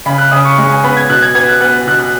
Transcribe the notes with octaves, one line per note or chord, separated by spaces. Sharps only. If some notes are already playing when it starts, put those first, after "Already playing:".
C#3 B5
F#6
C#3 D#6
C#6
G#3 C#6
G#5
B3 B5
G#6
B2 F#6
G#6
B3 G#6
F#6
B3 F#6
B2 F#6
F#6